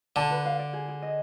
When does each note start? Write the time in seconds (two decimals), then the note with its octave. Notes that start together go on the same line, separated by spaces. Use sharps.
0.16 D3 A5
0.30 B4
0.45 F5
0.59 D5
0.73 G#4
0.88 G#4
1.02 D#5